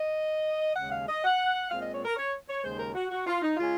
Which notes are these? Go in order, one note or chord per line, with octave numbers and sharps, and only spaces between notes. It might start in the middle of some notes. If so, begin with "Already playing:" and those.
Already playing: D#5
D#2 C#3 G#3 F#5
F5
D#5
F#5
A#2 G#3 C4 F5
D#5
C#5
A#4
C#5
C#5
D#2 C#3 G#3 C5
A#4
F#4
F#4
F4
D#4
C#3 G#3 C#4 F4